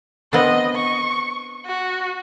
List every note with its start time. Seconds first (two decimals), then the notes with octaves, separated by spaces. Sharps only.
0.33 B3 C4 D4 D#5
0.76 C#6
1.66 F#4